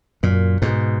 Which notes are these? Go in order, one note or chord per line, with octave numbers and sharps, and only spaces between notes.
F#2 A#2
G#2 B2